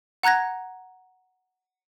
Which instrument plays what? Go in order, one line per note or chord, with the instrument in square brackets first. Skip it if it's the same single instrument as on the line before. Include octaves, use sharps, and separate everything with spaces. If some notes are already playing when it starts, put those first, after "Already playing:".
[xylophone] F#5 A#5 F#6 G#6 A#6